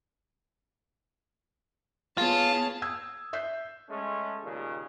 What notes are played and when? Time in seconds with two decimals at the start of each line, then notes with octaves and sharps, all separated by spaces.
2.18 B3 F4 G#4 C#5 A5
2.82 D#6 E6 G#6
3.33 E5 F#6 G6 B6 C7
3.90 G#3 A3 C#4
4.43 D#2 A#2 C#3